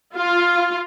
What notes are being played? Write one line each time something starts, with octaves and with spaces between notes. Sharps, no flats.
F4